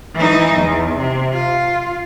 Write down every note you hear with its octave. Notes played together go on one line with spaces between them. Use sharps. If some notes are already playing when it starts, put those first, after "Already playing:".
E3 D#4
E2
C3
F4